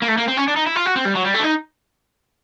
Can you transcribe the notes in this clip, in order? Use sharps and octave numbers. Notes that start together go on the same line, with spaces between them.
A#3
A3
A#3
C4
C#4
D4
D#4
E4
F4
F#4
C4
G3
F#3
G3
A3
D4
D#4